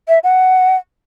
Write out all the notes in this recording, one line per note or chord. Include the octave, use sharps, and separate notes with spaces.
E5
F#5